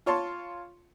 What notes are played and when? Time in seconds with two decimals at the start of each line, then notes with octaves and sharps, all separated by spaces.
0.06 F4 C#5 A5 C6